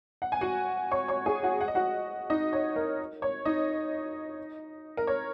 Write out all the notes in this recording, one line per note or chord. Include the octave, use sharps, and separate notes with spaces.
F#5
G#5
F#4 F#5
C#5 C#6
C#5 C#6
G#4 G#5
F#4 F#5
F#5
D#5
F#4 F#5
D#4 D#5
C#5
A#4
C#5
D#4 D#5
A#4
C#5